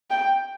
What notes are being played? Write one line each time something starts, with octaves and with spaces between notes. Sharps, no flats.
G5